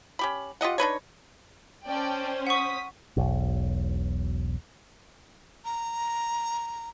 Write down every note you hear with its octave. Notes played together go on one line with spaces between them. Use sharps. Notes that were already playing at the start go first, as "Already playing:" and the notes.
C#4 G4 B5
F4 G4 D#5 F#5
D4 D#4 B4 C#5
C#4 C5 D5 G5 A5
F#5 C#6 D#6 B6
E1 B1
A#5